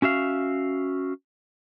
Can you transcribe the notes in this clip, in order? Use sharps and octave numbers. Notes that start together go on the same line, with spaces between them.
C#4 F#4 E5 F5